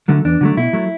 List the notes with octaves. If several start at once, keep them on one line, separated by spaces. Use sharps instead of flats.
D3 F#3 A3
E2 D4
D3 F#3 A3
B2 E4
F#3 A3